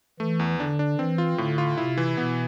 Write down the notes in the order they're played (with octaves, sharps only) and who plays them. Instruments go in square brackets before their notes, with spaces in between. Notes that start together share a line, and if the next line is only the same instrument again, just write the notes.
[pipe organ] E3 [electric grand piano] A3
[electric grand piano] E2
[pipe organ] D3 [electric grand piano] D4
[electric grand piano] D4
[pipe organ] E3 [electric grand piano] C4
[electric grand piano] F4
[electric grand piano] A2 [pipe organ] D3
[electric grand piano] F4
[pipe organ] C3 [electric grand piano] E4
[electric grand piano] E3
[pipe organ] B2 [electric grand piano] B3